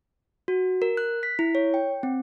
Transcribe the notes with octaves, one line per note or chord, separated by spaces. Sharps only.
F#4
A#4
F#6
B6
E4
C#5
G5
C4